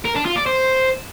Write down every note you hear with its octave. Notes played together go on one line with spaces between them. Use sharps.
A#4
D4
F4
D5
C5